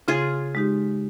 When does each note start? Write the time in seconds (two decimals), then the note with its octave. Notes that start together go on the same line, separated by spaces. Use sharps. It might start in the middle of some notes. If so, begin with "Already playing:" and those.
0.08 C#3 F4 G#4
0.55 G#3 D#4 G4